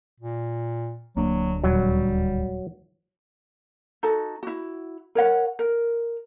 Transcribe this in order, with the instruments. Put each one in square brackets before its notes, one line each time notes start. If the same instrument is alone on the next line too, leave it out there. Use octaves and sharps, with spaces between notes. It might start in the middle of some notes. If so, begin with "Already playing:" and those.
[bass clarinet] A#2
[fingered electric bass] D1 D4 [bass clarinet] F#3 [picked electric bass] A#3
[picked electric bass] D#1 [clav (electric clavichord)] F#3 [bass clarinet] G3
[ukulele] D#4 F#4 A4
E4 F#4
A#4 C#5 F#5
A#4